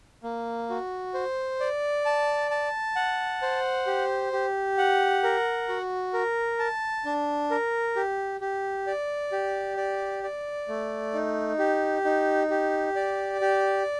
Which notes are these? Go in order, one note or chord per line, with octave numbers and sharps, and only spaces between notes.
A#3
F#4
C5
D5
A5
A5
F#5
C5
G4
G4
F#5
A#4
F#4
A#4
A5
D4
A#4
G4
G4
D5
G4
D5
D5
A3
D#4
G4
D#4
G4
D5
G4